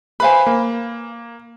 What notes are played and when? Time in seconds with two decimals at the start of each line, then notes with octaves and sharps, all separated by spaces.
0.20 B4 C5 F5 G#5 B5
0.47 A#3